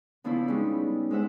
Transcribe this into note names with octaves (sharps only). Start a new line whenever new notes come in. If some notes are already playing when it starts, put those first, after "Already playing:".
C#3 F3 B3 C#4 D4 E4
G3 G#3 C#4 D#4
G#3 D4 C5 E5 F#5